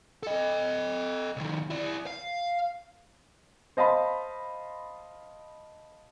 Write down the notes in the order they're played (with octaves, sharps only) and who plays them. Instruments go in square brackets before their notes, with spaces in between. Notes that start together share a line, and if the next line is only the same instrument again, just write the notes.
[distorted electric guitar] A4 D#5
C2 D#3
E4 D5
F5
[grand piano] C5 D#5 F5 A5 B5 C6